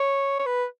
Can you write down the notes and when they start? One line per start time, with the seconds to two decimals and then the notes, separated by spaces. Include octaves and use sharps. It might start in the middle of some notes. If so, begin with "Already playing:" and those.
Already playing: C#5
0.39 C#5
0.46 B4